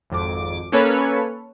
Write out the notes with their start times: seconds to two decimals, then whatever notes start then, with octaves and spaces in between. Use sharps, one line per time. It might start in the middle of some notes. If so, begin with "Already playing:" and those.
0.10 G#1 F2 D6
0.72 A#3 C#4 A4 B4 C#5